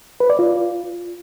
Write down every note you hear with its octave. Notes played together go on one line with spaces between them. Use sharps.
B4
D5
F4